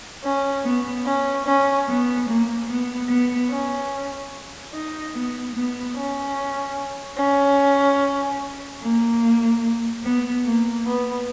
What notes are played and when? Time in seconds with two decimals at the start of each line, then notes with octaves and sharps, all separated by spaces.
0.23 C#4
0.64 B3
1.06 C#4
1.45 C#4
1.87 B3
2.28 A#3
2.68 B3
3.09 B3
3.50 C#4
4.72 D#4
5.13 B3
5.54 B3
5.95 C#4
7.18 C#4
8.81 A#3
10.04 B3
10.44 A#3
10.85 B3